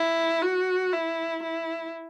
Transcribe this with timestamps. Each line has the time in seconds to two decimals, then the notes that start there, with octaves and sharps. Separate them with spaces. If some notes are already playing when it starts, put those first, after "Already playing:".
Already playing: E4
0.42 F#4
0.93 E4
1.43 E4